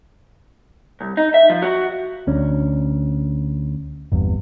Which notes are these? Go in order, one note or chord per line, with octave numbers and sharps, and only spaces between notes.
C2
D#4
E5
F3
F#4
D2 C#4 D4
G1 E2